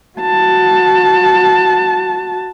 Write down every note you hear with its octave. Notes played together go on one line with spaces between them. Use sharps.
F#4 A5